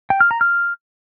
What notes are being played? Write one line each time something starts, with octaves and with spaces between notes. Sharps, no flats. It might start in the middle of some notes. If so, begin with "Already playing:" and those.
G5
F6
A#5
F6